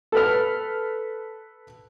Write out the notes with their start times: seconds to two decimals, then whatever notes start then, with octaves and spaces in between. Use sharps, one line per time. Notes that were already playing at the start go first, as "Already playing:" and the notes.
0.12 A4 B4 F6